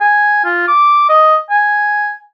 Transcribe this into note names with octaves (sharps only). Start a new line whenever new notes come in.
G#5
F4
D6
D#5
G#5